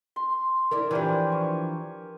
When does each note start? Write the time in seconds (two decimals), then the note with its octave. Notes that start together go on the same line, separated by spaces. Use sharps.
0.16 C6
0.71 D4 E4 A#4
0.91 E3 F3 D4 G4 A#4 G#5
1.32 C#6